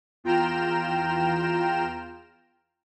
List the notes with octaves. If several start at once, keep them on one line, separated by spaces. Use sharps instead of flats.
E2 F4 G5 A#5 F6 E7